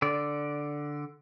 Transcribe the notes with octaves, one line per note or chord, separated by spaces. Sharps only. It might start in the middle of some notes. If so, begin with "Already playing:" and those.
D3 D5